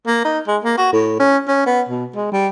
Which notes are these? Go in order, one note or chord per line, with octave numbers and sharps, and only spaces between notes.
A#3
D#4
G#3
A#3
F#4
A2
C#4
C#4
B3
B2
G#3
G3